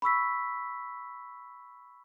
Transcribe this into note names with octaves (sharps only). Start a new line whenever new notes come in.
B5 C#6 E6 B6